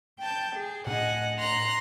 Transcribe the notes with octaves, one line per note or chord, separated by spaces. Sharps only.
G5 A5 G6
G#4
A2 D4 D#5 F#5 G#5
A#5 C6 F#6